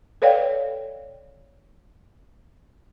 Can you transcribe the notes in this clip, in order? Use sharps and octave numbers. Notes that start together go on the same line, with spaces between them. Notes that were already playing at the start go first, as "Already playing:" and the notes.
A4 B4 C#5 D5 F5 G5